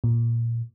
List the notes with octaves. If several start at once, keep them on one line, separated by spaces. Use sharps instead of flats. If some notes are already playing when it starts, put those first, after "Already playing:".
A#2